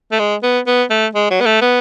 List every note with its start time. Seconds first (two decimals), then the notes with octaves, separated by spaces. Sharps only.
0.12 A3
0.19 G#3
0.43 B3
0.67 B3
0.90 A3
1.15 G#3
1.30 F#3
1.40 B3
1.46 A3
1.61 B3